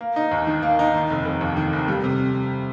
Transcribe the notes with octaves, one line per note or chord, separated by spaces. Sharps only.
A#3
D#4
D#2
D#3
A#3
D#4
D#3
F1
F1
D#2
D#3
F1
G3
C3